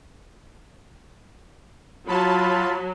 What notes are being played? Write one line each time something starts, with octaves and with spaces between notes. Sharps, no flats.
F#3 F4 A5 B5